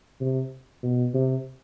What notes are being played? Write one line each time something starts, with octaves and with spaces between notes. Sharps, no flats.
C3
B2
C3